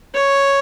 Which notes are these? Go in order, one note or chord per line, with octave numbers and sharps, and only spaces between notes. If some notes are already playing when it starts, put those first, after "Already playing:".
C#5